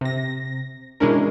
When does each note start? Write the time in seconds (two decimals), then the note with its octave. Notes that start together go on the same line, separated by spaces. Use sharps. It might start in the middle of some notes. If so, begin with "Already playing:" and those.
0.01 C3 A#6
1.00 B2 E3 G#3 C#4 D4 A#4